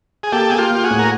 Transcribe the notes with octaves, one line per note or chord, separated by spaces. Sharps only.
G#4
A#3 G4 A4
A#3 G#4
F4 G4
A#3 G4
F#4 G#4
A2
A#4